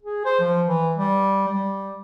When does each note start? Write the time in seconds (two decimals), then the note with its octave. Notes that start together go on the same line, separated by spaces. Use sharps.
0.03 G#4
0.25 C5
0.40 F3
0.67 E3
0.96 G3
1.48 G3